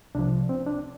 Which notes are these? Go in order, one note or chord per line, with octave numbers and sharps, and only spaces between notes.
C2 C3 F3 D4
C4
D4